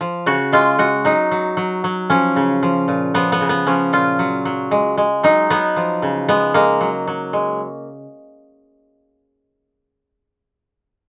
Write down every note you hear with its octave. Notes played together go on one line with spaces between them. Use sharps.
F3
C#3 F#4
G#3 F4
G#3 F#4
F#3 D#4
F#3
F#3
F#3
F3 C#4
C#3
F3
A#2
F3 B3
B3
C#3
B3
F3 C#4
A#2 F4
F#3
F#3
G#3
G#3
F#3 D#4
F#3 B3
F3
C#3
G#3 B3
G#3 A#3
F#3
F#3
G#3